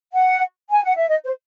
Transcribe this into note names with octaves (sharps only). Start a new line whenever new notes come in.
F#5
G#5
F#5
E5
D#5
C5